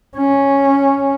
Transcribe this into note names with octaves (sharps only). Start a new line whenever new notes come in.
C#4